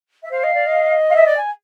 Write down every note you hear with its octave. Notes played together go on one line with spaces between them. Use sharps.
E5
C5 F5
D#5
D5
D#5
F5
E5
D5
G#5